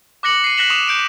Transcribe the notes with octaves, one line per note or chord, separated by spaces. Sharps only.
D6 F#6 A#6 C#7 F#7
C7 D#7
F#6 A#6 B6 E7 F#7
C#6 D#6 E7 F7
G6 D7